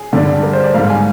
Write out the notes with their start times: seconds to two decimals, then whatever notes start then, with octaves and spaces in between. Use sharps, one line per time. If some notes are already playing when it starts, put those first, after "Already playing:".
Already playing: G#4
0.13 G2 D3 G3 D4
0.43 A#4
0.53 C5
0.64 D5
0.74 G#2 G3 A#3 F5
0.90 G#5